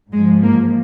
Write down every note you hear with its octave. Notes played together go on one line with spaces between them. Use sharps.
G#2 F3 G#3
A#3